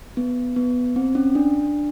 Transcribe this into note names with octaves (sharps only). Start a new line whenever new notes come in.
B3
B3
C4
C#4
D4